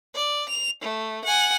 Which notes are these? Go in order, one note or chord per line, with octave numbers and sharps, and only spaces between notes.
D5
F7
A3
F#5 G#5